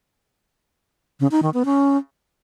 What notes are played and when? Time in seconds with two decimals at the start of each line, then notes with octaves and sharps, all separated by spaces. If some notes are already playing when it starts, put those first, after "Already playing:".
1.20 C#3
1.31 D#4
1.43 D#3
1.54 B3
1.65 C#4